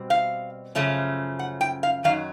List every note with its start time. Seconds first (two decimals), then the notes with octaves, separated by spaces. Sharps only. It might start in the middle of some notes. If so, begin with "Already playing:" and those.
Already playing: B2 G3 C4
0.10 F5
0.75 F#2 C#3 F3 A3 C#4
1.39 F#5
1.61 G5
1.83 F5
2.04 F#2 D#3 F#3 F5